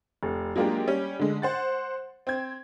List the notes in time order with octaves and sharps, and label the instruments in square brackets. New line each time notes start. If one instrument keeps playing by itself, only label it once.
[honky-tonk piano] F1
F#3 G#3 A#3 D4 F4 G4
G3 C#4
D3 G#3
C5 F#5 A6
C4 G#6